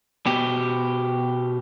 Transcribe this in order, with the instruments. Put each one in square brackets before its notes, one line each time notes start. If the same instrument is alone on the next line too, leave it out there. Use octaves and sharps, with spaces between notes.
[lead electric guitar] B2 G4